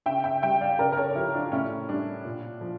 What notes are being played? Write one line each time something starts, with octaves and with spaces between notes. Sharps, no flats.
C#3 E5 G5
E5 G5
G3 E5 G5
D5 F5
C#3 A#4 D5
A#4
A4 C#5
F3 E4 G4
D4 F4
A2 C#4 E4
G3 D4
A#2
F3